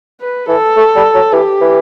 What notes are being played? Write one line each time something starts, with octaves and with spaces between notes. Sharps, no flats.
B4
E3 A4
A3
G3
F#3
E3 G4
E3